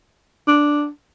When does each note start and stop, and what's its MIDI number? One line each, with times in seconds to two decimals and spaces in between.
0.47 0.88 62